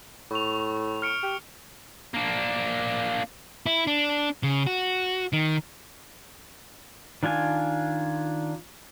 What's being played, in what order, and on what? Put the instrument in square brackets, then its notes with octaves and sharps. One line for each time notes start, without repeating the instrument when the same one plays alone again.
[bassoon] A2 [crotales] C#6 F7
[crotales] F6 C#7 D7
[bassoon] G4
[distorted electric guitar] A#3 D4
E4
D4
C#3
F#4
D#3
[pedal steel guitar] D#3 D4 F4 G#5